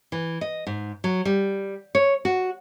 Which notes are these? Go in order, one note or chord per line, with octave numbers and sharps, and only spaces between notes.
E3
D#5
G#2
F#3
G3
C#5
F#4